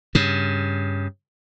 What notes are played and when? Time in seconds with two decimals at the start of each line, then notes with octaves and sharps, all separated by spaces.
0.15 G2 C#3